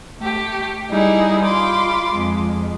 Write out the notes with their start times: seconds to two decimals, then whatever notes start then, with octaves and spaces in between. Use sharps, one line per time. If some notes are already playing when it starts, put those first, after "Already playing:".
0.21 A3 G4
0.91 G3 D#4 E4 G#4
1.45 F4 B5 C6 D6
2.14 F2 G#3